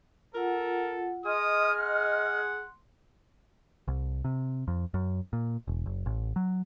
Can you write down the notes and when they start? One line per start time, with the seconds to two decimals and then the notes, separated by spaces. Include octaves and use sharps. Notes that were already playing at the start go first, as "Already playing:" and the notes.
0.35 F4 A4 A#4 F#5
1.25 G#4 D#5 C6 D#6 F6
1.80 F#5
3.88 C2
4.25 C3
4.68 F2
4.94 F#2
5.33 A#2
5.68 E1
5.86 F#1
6.06 A1
6.36 F#3